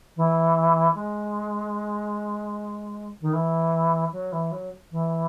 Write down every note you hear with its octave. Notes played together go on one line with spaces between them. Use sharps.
E3
G#3
D#3
E3
F#3
E3
F#3
E3